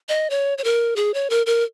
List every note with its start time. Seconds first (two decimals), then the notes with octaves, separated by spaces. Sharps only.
0.09 D#5
0.30 C#5
0.58 C#5
0.64 A#4
0.96 G#4
1.14 C#5
1.30 A#4
1.46 A#4